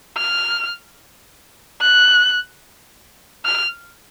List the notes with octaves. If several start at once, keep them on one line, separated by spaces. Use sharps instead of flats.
F6
F#6
F6